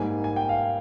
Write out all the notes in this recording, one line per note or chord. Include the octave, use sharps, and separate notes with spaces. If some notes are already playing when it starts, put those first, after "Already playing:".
Already playing: G#2 G3 A#3 G#5
G#5
G5
F5